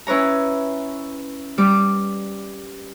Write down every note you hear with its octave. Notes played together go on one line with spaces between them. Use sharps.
C#4 E4 B4 C#5 A#5
G3 D6